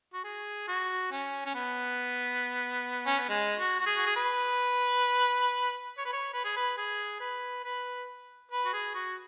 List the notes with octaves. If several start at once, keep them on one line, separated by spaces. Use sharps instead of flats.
F#4
G#4
F#4
C#4
C#4
B3
C#4
B3
G#3
F#4
F#4
G#4
F#4
G#4
B4
C#5
B4
C#5
B4
G#4
B4
G#4
B4
B4
B4
F#4
G#4
F#4